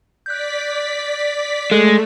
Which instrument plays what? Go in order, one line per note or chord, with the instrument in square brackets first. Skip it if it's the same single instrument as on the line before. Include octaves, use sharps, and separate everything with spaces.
[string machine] D5 B6 [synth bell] F#6 G6
[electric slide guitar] G#3 [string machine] A3 [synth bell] A4 F#6